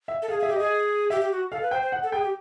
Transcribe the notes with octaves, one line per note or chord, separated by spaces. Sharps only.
E5
A4
G#4 F5
G#4 E5
G4
G#4 D#5
G4 E5
G4
F#4
A4 F5
B4
C5 G5
C5
F#5
A4
G#4 G5
G4